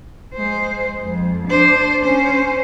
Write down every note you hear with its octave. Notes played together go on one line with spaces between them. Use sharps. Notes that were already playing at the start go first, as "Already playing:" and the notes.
G#3 C5
F2
D4 C5
C#4 C5